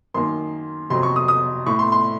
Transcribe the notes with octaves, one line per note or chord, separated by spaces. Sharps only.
F#2 D#3 A#3 C6
F2 C3 F#3 C6
C#6
D#6
D#6
A2 A3 C#6
C6
C6